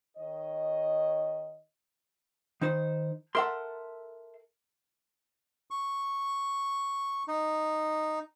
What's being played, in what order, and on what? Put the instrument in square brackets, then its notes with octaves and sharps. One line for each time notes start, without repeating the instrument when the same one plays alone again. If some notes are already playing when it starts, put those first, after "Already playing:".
[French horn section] D#3 C#5 D#5
[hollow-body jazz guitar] D#3 D#4 C5
[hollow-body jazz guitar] A4 E5 C6 [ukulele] A#4 F#5
[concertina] C#6
D#4